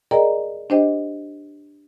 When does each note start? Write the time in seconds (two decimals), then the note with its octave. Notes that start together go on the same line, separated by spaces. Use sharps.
0.11 G#4 A#4 D5 D#5 G5 A#5
0.70 D4 G4 C5 D#5 G5